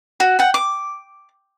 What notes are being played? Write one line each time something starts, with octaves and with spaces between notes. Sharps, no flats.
F#4
F#5 G5
D6